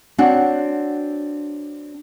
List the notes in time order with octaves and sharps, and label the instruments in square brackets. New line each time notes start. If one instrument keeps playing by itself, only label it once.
[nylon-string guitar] C4 D4 F#4 C#5 F#5 G5